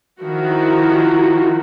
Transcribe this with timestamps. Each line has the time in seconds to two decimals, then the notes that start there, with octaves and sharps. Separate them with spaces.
0.20 D#3 F3 E4 F#4